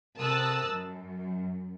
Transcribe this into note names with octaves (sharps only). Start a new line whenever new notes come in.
C3 A#4 A5 D#6 E6 F#6
F#2